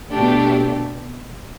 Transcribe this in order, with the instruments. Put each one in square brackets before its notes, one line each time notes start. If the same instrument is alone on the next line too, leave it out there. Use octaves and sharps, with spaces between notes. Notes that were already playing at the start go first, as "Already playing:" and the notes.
[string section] B2 A3 D4 G4